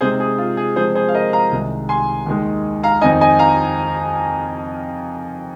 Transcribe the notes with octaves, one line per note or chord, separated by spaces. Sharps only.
C3 G#3 C4 D#4 G#4 C5
G#4
F4
G#4
C3 F3 G#3 C4 G#4 C5
G#4 C5
F5
A#4 D#5
F5 A#5
C2 C3 D#3 G#3 D#4
G#5 C6
D#2 D#3 G#3 D#4
F5 A#5
F2 D#3 C4 D#4 D#5 G#5
D#5 G#5
F5 A#5